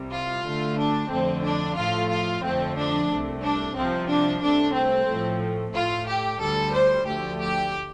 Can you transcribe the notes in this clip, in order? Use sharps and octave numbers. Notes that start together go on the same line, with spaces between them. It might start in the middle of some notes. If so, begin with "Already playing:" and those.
Already playing: C2 C3 G3
F4
D2 D3 A3
D4
F2 D3 A3 C4
D4
A2 F3 A3 F4
F4
F2 D3 F3 A3 C4
D4
C2 C3 A3
D4
C2 C3 F3 C4
D4
C2 C3 A3 D4
C4
A2 F3 A3
A2 A3 F4
G4
D2 D3 G3 A4
C5
D2 D3 F3 A3 G4
G4